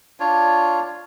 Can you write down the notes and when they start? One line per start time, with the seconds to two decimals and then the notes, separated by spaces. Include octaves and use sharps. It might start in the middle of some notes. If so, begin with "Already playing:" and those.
0.20 D4 F4 C#5